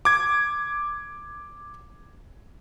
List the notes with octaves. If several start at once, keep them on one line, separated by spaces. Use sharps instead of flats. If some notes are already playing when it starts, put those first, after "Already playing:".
D6 G#6